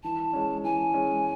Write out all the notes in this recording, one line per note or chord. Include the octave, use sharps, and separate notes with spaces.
E3 A5
G#3 C#4
E3 G#5
G#3 C#4